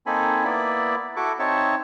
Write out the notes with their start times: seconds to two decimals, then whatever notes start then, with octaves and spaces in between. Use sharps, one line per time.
0.06 A#3 C4 D#4 A4 G#5 B5
0.44 A#3 B3 E4 D5 B5
1.16 E4 F#4 A4 C#6 D6
1.39 C4 D#4 C#5 E5 A5 C#6